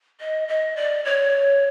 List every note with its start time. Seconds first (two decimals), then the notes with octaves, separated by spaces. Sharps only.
0.20 D#5
0.48 D#5
0.76 D5
1.05 C#5